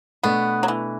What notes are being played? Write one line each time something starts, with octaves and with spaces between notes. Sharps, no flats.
B2 A3 B3 D4
F#3
E3